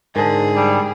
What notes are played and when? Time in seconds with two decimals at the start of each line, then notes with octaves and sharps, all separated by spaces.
0.16 G#2 D3 G#4 A#4 A5
0.56 G3